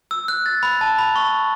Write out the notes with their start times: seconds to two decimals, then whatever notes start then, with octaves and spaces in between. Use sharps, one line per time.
0.11 E6
0.28 F#6
0.46 A6
0.63 B5
0.81 A5
0.99 B5
1.16 C#6